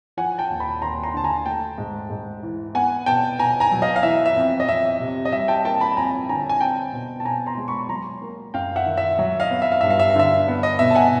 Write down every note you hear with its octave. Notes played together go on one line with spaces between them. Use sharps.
F3 F#5 G#5
G5 A5
D#2
A5 B5
D#2 A#5 C6
A#5 C6
D3 A5
G#5 A#5
A3 G5 A5
G#2
G#2
E3
B3 F#5 G#5
B2 G5 A5
B2 G#5 A#5
G#5 A#5
F#3
D#5 F5
F5
E3 E5
E5
F2
D#5
F2 E5
C3
D#5
G3 E5
G5 A5
A#3 G5 A5
A5 B5
F2 G#5 A#5
D3 G#5 A#5
G#5
C4 G5 A5
B2
A5
B2 G#5 A#5
A#5 C6
G#3
B5 C#6
F#3 A#5 C6
A#3
F#2 F5 G5
E5 F#5
D#3
E5
F#3 E5
D#5 F5
B3
E5
F5
G2 E5
F5
E5
F5
D3 E5
B3
D#5
B2 E5
A5
F#5 G#5